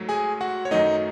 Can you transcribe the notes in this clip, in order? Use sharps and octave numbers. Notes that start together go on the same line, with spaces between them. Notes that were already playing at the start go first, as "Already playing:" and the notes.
Already playing: G#2 F#3 A3
G#4 G#5
F#4 F#5
C#5
F#2 D#3 F#3 A3 D#4 D#5